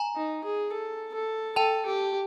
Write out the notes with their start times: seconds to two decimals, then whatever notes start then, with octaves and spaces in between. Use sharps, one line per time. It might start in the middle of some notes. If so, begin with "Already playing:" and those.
Already playing: G#5 A#5
0.16 D#4
0.44 G#4
0.72 A4
1.14 A4
1.56 A4 G5 A5
1.86 G4